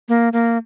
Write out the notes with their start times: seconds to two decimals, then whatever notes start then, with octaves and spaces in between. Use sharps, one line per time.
0.09 A#3
0.33 A#3